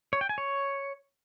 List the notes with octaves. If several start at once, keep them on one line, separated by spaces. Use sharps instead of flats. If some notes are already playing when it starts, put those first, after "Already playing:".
C#5
G5
G#5
C#5